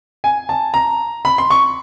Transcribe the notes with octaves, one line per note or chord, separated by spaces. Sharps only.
G#5
A5
A#5
B5
C6
C#6